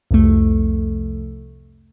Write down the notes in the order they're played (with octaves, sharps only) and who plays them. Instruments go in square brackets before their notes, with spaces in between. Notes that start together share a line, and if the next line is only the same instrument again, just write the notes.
[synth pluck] C2 F2 A3